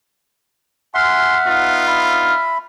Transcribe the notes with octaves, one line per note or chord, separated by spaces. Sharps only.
E5 F#5 G#5 C6 F6
B3 D#4 F4
E5 B5